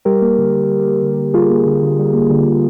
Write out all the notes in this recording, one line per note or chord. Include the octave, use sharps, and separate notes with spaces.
G3 G4 A#4
A#3
D3
D3
G3
A#3
D3
D3
G3 F4 G#4
A#3
D3
D3
G3
A#3
D3
D3